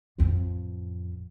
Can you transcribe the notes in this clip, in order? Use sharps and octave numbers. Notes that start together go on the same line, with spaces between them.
A1 F2